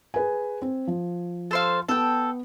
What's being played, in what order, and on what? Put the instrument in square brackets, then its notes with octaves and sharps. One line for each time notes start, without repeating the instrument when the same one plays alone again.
[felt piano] G#4 B4 G#5
C4
F3
[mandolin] A4 C5 F5
[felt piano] B3 [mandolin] A4 G5